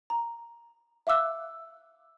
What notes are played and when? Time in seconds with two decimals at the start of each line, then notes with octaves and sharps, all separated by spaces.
0.10 A#5
1.07 E5 F5 D6 E6 F#6